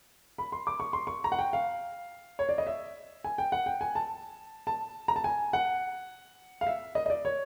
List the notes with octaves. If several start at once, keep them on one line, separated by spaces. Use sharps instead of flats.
B5
C6
D6
C#6
C6
C#6
A#5
F#5
G5
F5
C#5
D5
D#5
E5
G#5
G5
F#5
G5
G#5
A5
A5
A#5
A5
G#5
F#5
F5
E5
D#5
D#5
D5
C#5